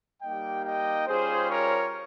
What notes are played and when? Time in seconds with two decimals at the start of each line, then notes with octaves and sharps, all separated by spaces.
0.22 G3 A#3 D#4 G4 D#5 G5
0.65 D#5 G5
1.07 G3 C#4 F4 G#4 C5
1.50 A#4 C#5